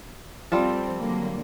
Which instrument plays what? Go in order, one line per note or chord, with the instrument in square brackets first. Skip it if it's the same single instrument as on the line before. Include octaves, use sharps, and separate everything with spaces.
[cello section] F3 C4 [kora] G3 F4 A4
[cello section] D3 F#3 A#3